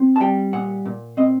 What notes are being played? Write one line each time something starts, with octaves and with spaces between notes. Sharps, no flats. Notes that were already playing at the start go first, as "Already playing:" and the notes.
Already playing: C4
A5
G3 G5
A#2 F#5
A#2
C4 D#5